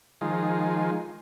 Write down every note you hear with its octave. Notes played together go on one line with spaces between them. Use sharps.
D#3 F3 G#3